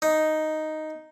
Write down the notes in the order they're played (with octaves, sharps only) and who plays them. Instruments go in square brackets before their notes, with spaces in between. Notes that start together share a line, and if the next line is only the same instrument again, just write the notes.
[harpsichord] D#4